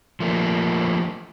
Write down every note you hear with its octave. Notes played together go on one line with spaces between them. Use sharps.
F3 A3 A#3